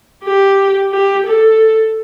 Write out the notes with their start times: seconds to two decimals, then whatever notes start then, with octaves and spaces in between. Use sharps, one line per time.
0.24 G4
0.92 G4
1.26 A4